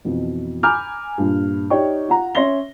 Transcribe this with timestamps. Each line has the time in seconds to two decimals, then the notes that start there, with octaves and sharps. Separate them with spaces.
0.05 F2 B2 E3
0.63 G#5 A#5 B5 D6 F6 G6
1.18 G2 A#2
1.70 D#4 G4 C#5 D5 G5 C#6
2.09 F4 F#5 A#5
2.35 C#4 C#5 E5 C6 A#6 G7